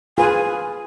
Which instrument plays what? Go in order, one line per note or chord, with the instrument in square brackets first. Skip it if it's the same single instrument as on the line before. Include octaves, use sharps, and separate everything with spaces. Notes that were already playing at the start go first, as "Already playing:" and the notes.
[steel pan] F4 G#4 B4 [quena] G#5